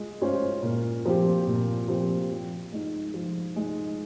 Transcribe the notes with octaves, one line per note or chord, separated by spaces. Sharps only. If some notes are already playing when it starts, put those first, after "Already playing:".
Already playing: G#3 F4
C#4 F4 C5
A#2
F3 C4 G4
A#2
F3 C4 G4
F3
G#3 D#4
F3
G#3 D#4